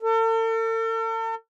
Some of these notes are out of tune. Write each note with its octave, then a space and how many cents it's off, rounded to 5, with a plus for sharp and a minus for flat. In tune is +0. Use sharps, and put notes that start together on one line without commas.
A4 +45